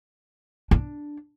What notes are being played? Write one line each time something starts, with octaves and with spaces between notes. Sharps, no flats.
D4